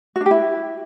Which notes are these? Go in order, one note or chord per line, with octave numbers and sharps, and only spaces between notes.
F#4
D4
G4
E4